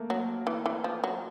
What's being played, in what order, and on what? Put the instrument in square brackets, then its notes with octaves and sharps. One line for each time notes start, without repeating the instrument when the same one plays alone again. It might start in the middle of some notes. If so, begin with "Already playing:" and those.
Already playing: [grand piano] A3 A#3
[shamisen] F#3
E3
E3
F3
F#3